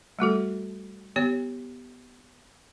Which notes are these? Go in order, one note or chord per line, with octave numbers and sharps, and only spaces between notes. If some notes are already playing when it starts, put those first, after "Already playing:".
G3 A3 F#4 A4
B3 G4 C#5